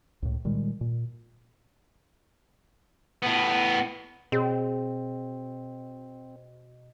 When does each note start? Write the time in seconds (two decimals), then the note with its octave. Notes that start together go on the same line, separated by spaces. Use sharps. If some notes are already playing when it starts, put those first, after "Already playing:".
0.22 C#2 A2
0.45 A#2 D#3 G3 G#3
0.81 A#2
3.22 A2 B3
4.32 B2 C4 G#4 C#5